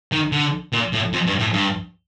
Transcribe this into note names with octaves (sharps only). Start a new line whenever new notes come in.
D#3
D3
A#2
A2
F2
G2
A2
G2